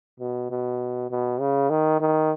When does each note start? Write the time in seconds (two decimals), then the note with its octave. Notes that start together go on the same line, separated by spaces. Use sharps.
0.20 B2
0.50 B2
1.11 B2
1.40 C#3
1.70 D#3
2.00 D#3